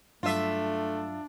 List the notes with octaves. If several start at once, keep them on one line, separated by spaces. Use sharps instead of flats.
G2 F#3 A3 D4 F4 E5